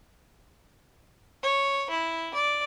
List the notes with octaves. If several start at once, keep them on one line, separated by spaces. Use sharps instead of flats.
C#5
E4
D5